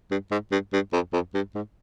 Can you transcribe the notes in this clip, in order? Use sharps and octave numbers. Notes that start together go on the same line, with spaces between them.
G2
G#2
G2
G2
F2
F2
G2
G#2